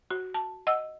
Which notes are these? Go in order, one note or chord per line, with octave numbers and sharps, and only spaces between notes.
F#4
A5
D#5 F#5 E6